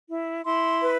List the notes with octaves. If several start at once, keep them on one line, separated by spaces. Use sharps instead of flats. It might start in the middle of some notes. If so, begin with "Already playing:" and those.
E4
E4 C6
B4